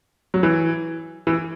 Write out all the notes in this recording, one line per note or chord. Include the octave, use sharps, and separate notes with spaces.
F#3
E3
E3